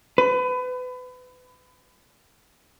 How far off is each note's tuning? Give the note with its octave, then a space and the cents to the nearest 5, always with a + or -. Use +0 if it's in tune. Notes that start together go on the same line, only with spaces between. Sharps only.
B4 +30